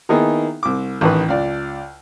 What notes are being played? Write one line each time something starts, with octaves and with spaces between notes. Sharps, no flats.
D#3 A#3 B3 D#4 E4 G#4
C2 D6
A1 D#3 B4
C#2 D5